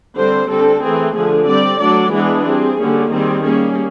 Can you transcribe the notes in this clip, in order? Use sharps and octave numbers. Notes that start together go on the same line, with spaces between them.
D3 G3 C4 C5
D3 G3 C4 A4
E3 A3 C4 G#4
D3 F3 A3 G#4
G3 C4 D5
F#3 A3 D4 D5
E3 G#3 B3 D4 G#4
G3 C4
D3 G3 A#3 C#4
D#3 G3 C4 G#4
G3 A#3 C#4 G#4